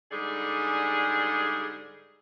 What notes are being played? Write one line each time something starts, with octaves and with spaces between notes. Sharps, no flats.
G#2 D3 G3 G#4